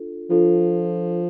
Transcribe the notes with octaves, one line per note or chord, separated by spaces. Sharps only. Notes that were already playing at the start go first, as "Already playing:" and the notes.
Already playing: D4 F4 A4
F3 D4 F4 A4